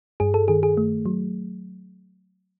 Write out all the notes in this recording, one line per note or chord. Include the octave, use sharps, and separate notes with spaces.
G2 G#4
A4
D#3 G#4
G#4
A3
F#3